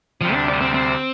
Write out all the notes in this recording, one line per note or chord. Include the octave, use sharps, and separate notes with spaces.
D2 C3 F3 G3
D4
C4
C4